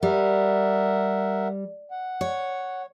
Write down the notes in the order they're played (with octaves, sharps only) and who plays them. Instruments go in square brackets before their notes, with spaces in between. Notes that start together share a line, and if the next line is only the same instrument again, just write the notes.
[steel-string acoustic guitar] G3 [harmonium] A#4 E5 F#5
[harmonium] F#5
[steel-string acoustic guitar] C#5